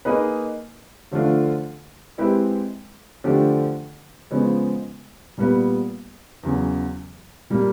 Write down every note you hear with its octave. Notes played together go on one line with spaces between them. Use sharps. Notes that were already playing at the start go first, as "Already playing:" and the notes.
A#3 D#4 G#4 B4
D3 F3 A3 D4 F4
G#3 C4 E4 G4 B4
D3 F3 A3 D4 G4
C#3 F3 G#3 B3
A#2 G3 B3
E2 C#3 F#3
A#2 G3 A#3